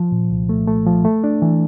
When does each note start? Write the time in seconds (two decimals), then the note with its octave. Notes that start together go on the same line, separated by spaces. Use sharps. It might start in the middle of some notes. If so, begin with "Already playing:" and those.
Already playing: F3
0.12 A#2
0.31 C2
0.49 A3
0.67 A3
0.87 F3
1.05 A3
1.24 D4
1.42 E3